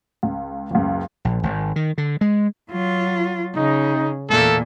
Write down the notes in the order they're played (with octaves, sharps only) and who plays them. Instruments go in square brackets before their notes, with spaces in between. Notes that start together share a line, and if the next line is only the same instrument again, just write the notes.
[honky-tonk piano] C#2
F#1 C#2
[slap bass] A#1
G#1
D#3
D3
G#3
[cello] F#3 F4
[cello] C#3 [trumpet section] D#4
[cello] E2 A#2 [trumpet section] A3 A#3 A4